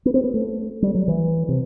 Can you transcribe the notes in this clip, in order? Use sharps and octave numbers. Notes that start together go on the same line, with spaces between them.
B3
C4
B3
A3
G3
F#3
E3
C3